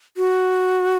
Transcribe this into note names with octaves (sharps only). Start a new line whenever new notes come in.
F#4